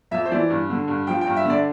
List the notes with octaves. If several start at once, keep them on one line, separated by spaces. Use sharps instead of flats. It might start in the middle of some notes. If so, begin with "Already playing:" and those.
F2 E5
C5
E3 D5
G2
D3
G2
F3 G5
G5
G2
E5
D3 D5